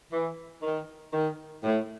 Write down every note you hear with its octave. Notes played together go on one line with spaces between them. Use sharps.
E3
D#3
D#3
A2